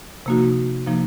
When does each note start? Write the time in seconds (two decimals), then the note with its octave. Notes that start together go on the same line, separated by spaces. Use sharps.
0.26 C3 F3 A#3 D#4 F#4
0.87 C3 F3 A#3 D#4